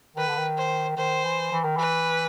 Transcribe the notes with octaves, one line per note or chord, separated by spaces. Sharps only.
D#3 B4
D3
D#3
C5
D#3 C5
E3
E3
D#3
E3 B4